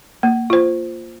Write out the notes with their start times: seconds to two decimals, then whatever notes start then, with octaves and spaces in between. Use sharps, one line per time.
0.23 A#3
0.50 F4 C5